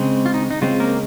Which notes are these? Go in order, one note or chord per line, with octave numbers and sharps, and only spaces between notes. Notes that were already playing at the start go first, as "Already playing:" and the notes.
Already playing: C#3 G#3 C4
F4
D#4
D#4
C#3 G#3 C4 F4
A#3 A#4